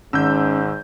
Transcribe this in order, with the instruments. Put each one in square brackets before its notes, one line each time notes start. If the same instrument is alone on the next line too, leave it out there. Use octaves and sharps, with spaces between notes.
[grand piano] G#1 [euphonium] G#2 [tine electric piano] C#4 [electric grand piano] E6 G6